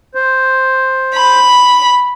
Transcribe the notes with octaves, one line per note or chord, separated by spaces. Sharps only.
C5
B5